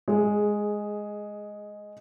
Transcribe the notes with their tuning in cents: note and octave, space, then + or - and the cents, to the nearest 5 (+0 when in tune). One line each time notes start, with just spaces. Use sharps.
G#3 +0 G#4 +15